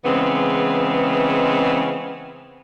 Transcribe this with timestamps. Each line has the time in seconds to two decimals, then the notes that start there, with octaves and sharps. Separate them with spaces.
0.05 C#3 E3 G#3 B3 C4